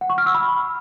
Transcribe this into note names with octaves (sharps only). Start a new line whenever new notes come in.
F#5
C#6
F6
E6
B5